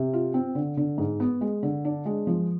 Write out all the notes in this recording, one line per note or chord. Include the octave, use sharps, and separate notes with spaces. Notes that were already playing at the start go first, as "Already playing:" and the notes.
Already playing: C3
F4
C4
D3
D3
G#2
B3
G#3
D3
D4
G#3
F3